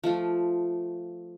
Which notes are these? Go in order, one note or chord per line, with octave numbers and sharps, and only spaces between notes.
F3 A3 F4